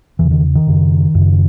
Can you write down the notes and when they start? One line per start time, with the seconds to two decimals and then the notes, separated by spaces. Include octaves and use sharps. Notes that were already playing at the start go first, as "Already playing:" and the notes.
0.19 E2 C#3 E3
0.31 D#3
0.55 D#3
0.67 F#2 C#3
1.15 F#2 C#3